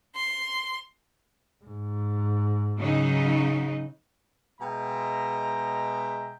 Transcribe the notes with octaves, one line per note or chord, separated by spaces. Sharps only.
C6
G#2
C#3 F#3 D#4
B2 G#3 E5 G5 A#5